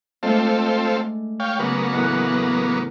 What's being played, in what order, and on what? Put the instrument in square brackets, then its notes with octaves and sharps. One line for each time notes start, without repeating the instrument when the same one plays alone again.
[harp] G#3 A3 D4 [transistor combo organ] C4 F4 A4
[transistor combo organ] C#5 F5 G5
[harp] C#3 [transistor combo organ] F#3 A#3 B3
[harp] E2 A2 F#5